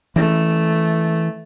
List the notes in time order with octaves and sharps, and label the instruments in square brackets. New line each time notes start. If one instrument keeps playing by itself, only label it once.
[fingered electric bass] E3 C#4 [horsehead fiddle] A3